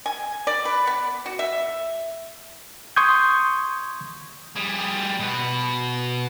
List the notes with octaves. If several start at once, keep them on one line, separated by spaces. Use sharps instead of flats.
G#5
D5
B4
B3
F#4
E5
C6 C#6 D#6 G6 G#6
G3 G#4
B2 B4